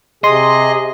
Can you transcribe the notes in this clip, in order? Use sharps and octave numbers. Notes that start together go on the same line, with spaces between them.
C3 G#4 D#5 C6